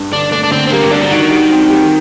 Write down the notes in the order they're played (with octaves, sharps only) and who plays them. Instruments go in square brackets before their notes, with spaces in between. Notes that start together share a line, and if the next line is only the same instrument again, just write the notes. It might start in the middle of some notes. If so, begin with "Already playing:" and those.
Already playing: [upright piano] G2
[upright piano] D3 [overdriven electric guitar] D4
[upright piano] A3 [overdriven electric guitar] D4
[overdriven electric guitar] D4
[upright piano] D3 [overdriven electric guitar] C4
[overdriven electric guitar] C4
[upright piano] G3 [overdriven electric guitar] A#3
[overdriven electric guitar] C3
[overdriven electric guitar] D3 [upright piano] D4
[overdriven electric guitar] F#3
[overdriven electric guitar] D#3 [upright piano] F#4
[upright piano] G3
C4
G4